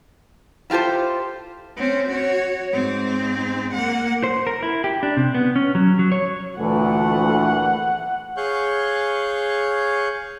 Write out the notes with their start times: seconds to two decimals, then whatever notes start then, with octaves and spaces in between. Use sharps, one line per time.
0.70 E4 F4 G4 A4 C5
1.77 C4 C#4
2.08 F#4 C#5
2.72 G#2 C4
3.73 A#3 F#5
4.24 C5
4.47 A#4
4.63 E4
4.84 G4
5.03 D4
5.17 C3
5.35 B3
5.56 C#4
5.75 F#3
5.99 F#3
6.12 C#5
6.57 D2 A#2 E3 A3 F#5
8.37 G#4 C#5 F5 C#6 F#6 G6